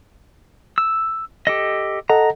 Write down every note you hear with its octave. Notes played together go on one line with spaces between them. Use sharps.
E6
G4 A4 D#5
A4 D#5 F#5 A#5